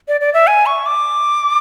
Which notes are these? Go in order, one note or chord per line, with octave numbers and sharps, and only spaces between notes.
D5
D5
E5
G#5
C#6
D6